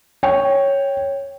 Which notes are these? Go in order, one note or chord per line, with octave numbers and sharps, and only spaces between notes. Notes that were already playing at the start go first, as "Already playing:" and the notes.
C#5 G5